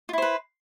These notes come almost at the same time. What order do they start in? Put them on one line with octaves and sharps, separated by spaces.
F4 E4 C5 B4